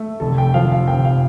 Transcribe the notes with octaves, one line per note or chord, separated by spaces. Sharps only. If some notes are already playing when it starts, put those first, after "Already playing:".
Already playing: A3
F1 A4
G5
F3 F5
F5
F1 G5
F5